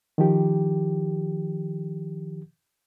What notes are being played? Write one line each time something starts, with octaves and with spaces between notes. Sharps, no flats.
D#3 F3 G4